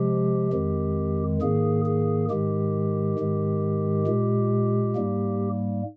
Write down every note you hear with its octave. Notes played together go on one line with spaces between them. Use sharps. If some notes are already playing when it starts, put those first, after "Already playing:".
Already playing: C3 F3 G#3 G4
F2 D#3 G#3
G#2 D#3 A#3 G#4
G#4
G#2 D#3 G#3 G4
G#2 D#3 G#3
A#2 G#3
G#2 G3 A#3